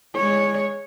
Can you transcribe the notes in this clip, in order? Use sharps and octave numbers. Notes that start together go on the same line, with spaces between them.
G#3 C#5